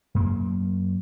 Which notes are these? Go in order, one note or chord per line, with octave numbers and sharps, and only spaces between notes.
F#2 A#3